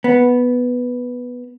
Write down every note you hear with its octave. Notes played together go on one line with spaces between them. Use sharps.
B3